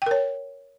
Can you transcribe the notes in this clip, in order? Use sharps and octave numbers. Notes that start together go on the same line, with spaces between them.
A#4 C#5 G5